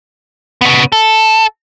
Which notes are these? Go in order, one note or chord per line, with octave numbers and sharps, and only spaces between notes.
C#3 B3
A4